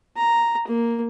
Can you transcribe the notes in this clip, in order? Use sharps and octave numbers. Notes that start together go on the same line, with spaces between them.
A#5
A#3